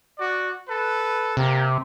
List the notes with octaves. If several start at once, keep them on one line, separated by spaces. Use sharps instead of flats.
F#4 D5
A4 B4
C3 A#3 G4